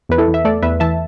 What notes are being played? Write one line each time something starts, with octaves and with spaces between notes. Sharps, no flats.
E2 B4
E4 A4
E2
E5
A3 A4 D5
E2 B4 E5
E3 E5 A5